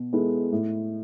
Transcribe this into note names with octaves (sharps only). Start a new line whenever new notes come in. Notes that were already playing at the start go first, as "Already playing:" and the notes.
Already playing: B2
G#3 B3 E4 A4
A2